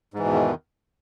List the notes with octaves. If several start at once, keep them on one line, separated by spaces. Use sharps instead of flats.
E2 G#2 B2 D#3 E3